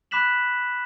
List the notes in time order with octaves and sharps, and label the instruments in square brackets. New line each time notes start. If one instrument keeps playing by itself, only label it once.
[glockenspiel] B5 D6 F#6 B6 E7 F#7